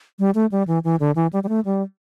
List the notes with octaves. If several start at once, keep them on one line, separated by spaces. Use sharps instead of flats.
G3
A3
G3
E3
E3
D3
E3
G3
G3
A3
G3